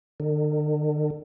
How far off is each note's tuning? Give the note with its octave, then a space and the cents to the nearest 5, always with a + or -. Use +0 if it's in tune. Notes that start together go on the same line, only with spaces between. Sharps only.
D3 +45